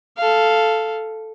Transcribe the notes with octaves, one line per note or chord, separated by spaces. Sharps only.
A4 F5